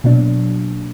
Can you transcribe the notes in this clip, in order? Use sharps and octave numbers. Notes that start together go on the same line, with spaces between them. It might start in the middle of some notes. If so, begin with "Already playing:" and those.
B2 F#3 A#3 D4